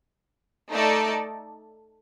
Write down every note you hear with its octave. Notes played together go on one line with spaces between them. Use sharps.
A3 D#4 A4 D5 A5